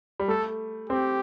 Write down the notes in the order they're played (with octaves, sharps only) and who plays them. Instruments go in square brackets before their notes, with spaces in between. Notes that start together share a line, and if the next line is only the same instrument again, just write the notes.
[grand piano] G3
[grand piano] A3 [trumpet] A4
[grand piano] C4 [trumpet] G4